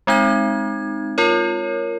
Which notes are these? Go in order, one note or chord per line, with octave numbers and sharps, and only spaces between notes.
G#3 C4 D#4 G#6
F4 A#4 C#5